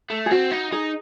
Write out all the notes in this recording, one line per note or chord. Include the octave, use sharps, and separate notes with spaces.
A3
G#4
C4 F#4
D#4
D#4 G#4